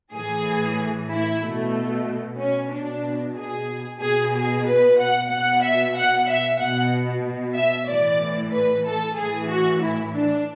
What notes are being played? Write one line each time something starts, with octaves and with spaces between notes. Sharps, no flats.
A2 E3 G#4
E4
B2 A3
C#4
B2 D4
G#4
B2 G#4
G#4
B4
F#5
B2 F#5
E5
F#5
E5
B2 F#5
E5
A2 E3 D5
B4
A4
A2 E3 G#4
F#4
E4
D4